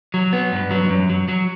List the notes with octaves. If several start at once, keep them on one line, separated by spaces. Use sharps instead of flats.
F#3
B3
G2
F#3
F#2
F#3
F#3